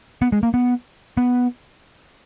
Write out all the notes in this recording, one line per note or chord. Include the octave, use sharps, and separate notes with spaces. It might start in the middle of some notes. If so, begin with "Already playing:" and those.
B3
G#3
A#3
B3
B3